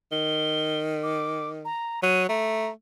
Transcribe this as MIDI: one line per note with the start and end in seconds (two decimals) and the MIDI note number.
0.12 1.67 51
0.12 0.80 103
1.03 1.50 86
1.65 2.00 82
2.03 2.27 54
2.03 2.23 99
2.29 2.69 57
2.29 2.71 82